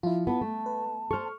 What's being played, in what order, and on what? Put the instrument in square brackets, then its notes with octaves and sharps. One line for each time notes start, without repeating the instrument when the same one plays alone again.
[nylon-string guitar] F3 [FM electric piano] E4 F4
[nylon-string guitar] B3 B4 [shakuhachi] A5
[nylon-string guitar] A3
[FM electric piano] B4
[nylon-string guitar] A4 C5 [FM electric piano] C#6 F6